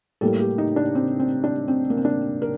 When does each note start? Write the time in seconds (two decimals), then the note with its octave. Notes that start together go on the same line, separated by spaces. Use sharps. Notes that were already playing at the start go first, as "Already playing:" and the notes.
0.21 A2 G3 A#3 A4
0.40 G4
0.58 D#4
0.76 D4
0.95 C4
1.20 C4
1.44 D4
1.68 C4
1.90 A#3
1.97 C4
2.05 D4
2.42 A#4